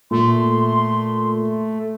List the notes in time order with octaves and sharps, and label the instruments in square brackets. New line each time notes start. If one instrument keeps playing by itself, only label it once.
[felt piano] A#2 [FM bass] A3 [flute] C6